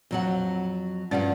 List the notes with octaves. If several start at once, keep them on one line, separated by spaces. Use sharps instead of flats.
F2 F#3 F#5
G2 F3 G3 C#4 D5 F#5